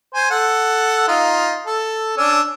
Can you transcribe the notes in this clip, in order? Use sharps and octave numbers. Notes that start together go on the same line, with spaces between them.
C5 G#5
A4 F#5
D#4 F4
A4
C#4 D4 E6